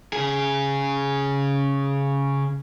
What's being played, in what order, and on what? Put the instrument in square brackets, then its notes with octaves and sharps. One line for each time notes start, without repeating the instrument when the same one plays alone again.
[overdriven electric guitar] C#3 G#4